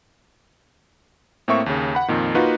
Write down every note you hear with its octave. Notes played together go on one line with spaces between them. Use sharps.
A2 A#3 C4 E5 C#6
D#2 C#3
F#5 B5
F2 A#2 D#3
A#3 D#4 F4 F#4 B4